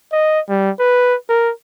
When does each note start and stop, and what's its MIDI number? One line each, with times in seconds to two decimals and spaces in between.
0.13 0.40 75
0.49 0.71 55
0.80 1.16 71
1.29 1.51 70